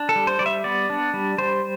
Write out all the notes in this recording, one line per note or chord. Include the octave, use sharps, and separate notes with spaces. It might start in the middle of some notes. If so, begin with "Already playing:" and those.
Already playing: D4
A4
G3
C5
G3 D5
E5
B3 D5
D4
G3
G3 C5